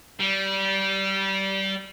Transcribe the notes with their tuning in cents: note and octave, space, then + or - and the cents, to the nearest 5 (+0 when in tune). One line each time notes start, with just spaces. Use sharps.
G3 -20